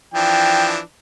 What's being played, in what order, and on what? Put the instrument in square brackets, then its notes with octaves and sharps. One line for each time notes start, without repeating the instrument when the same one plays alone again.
[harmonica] E3 F3 D4 [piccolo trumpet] G5